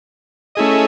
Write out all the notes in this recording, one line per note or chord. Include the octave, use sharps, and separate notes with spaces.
A3 C#4 E4 G#4 D#5